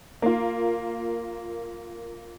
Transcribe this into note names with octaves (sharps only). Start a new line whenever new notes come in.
A#3 F4